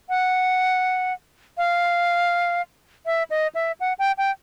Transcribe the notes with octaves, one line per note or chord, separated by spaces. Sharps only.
F#5
F5
E5
D#5
E5
F#5
G5
G5